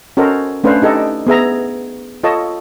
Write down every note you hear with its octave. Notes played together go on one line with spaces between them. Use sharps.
C#4 F#4 A4 A#4 C5 D#5
A3 C#4 D4 B4 C5 F5
D#4 G4 A4 D#5
B3 G#4 E5 A#5
F4 A4 C#5 D#5 A5